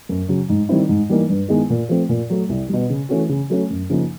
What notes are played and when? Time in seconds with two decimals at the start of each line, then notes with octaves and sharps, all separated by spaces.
0.09 F#2
0.28 C#3 F#3
0.49 G#2
0.69 D#3 G3 C4 E4
0.89 G#2
1.09 E3 G3 A#3 D#4
1.29 G2
1.48 D#3 G#3 B3 E4
1.70 A#2
1.89 F3 A3 C4
2.09 A#2
2.30 F#3 A3
2.49 C2
2.69 B2 G3
2.90 C#3
3.09 E3 A3 C#4 F#4
3.29 C#3
3.50 F#3 A3 C#4
3.70 F#2
3.90 C#3 F3 A#3 D#4